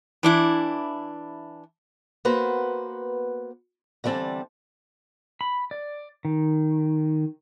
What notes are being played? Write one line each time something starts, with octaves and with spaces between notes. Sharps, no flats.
E3 D4 E4
A#3 B3 F#4 B4 C5
D3 E3 G3 C4 A5
B5
D5
D#3